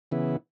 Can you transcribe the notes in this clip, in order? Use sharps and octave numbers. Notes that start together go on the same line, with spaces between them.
C#3 E3 B3 E4